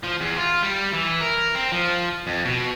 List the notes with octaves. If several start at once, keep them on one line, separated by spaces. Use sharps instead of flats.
F3
E2
F4
G3
E3
A#4
C4
F3
F2
B2